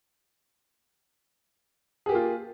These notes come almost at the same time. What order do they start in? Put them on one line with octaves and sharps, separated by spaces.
G#4 G4 A#3 F4